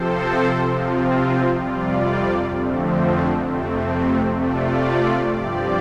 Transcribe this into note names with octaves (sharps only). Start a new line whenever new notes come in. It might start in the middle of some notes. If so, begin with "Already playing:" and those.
Already playing: C3 F3 C4 A4 C5
C3 F3 C4 F4
F2 C3 G3 F4 D5
F2 D3 F3 A3 C4
F2 C3 A3 C4
C3 A3 F4 D5
G2 F3 C4 G4 D5